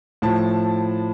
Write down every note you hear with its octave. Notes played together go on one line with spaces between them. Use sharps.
A2 F3 A5